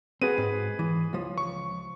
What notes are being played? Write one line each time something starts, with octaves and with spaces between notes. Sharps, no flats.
C4 F#4 G#4 B4 D#7
G#2
E3
C#2 F3
C#6